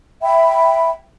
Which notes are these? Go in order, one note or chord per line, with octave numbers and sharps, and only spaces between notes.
E5 G5 B5